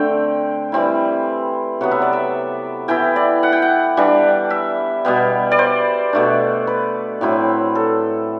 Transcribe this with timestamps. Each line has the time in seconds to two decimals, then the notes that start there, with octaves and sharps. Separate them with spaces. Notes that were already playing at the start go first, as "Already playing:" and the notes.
Already playing: D3 A3 C4 G5
0.72 E3 G3 C4 E4
1.81 C3 F#3 B3 F#5
1.91 E5
2.02 D5
2.13 E5
2.88 E3 B3 E4 G5
3.16 D5
3.43 F#5
3.53 G5
3.62 F#5
3.97 E3 G3 D4
4.50 E5
5.05 B2 G3 B3
5.51 D5
5.59 C5
6.13 B2 A3 D4
6.67 B4
7.21 A2 F#3 C4 E4
7.75 A4